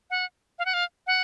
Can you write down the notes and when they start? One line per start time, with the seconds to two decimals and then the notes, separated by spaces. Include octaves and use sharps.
0.10 F#5
0.59 F5
0.65 F#5
0.74 F5
1.07 F#5